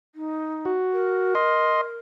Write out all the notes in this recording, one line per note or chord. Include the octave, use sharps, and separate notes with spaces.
D#4
F#4
A#4
D#5 C6